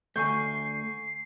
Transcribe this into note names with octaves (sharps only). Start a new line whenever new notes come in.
D2 A3 G#5 C#6 G6 C7